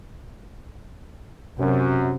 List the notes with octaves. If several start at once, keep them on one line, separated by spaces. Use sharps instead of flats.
F#2 C3